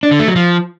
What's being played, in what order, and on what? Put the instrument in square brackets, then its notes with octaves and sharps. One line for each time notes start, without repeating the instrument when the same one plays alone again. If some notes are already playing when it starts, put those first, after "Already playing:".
[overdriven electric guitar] D4
D3
A3
F#3
F3